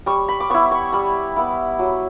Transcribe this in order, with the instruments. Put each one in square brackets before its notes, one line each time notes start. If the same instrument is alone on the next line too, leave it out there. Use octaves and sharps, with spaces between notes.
[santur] G3 C#6
B5
D6
B3 E4 C#6
C#6
G3 B5
B3 E4
F#3